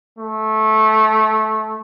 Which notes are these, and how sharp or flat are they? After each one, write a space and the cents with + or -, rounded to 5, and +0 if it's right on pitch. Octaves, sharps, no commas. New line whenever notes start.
A3 -15